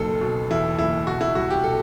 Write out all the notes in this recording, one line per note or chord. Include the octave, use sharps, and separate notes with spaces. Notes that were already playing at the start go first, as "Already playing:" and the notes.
Already playing: F#1 B1 A4
B2
E2 E4
F#1 E4
B2 F#4
E4
C2 F#4
G4
B2 A4